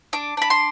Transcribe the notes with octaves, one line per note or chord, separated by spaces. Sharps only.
D4 D6
D4 B5
C6